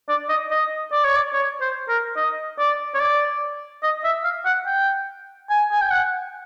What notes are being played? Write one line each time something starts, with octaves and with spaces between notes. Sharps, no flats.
D5
D#5
D#5
D5
C#5
D5
C#5
C5
A#4
D#5
D5
C#5
D5
D#5
E5
F5
F#5
G5
G#5
G#5
G5
F#5